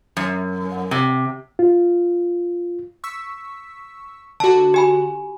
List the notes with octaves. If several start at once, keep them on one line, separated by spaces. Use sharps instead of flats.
F#2
C3
F4
C#6 E6 B6
D3 F#4 A5
G4 G#5 B5